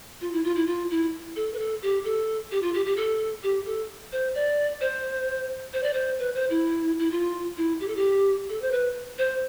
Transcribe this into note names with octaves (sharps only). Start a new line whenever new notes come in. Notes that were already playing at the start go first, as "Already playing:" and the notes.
F4
E4
F4
E4
F4
E4
A4
B4
A4
G4
A4
G4
F4
G4
G4
A4
G4
A4
C5
D5
C5
C5
D5
C5
B4
C5
E4
E4
F4
E4
G4
A4
G4
A4
C5
B4
C5